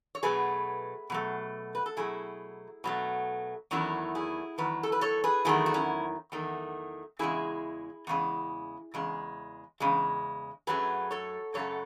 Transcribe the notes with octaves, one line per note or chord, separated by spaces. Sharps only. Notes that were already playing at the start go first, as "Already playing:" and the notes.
C#5
B2 F#3 A3 G#4 B4
B2 F#3 A3
B4
A4
B2 F#3 A3 E4 G#4
B2 F#3 A3
E2 D#3 F#3 A3 C#4 E4
E4 G#4
E2 D#3 F#3 B4
A4
B4
A4 C#5
G#4 B4
E2 D#3 F#3 A3 E4 G#4
F#4
C#4 E4
E2 D#3 F#3 A3
E2 C#3 G#3 E4 G#4
E2 C#3 G#3
E2 C#3 G#3
E2 C#3 G#3
F#2 C#3 F#3 A3 G#4 B4
A4 C#5
F#2 C#3 F#3 A3 A4 C#5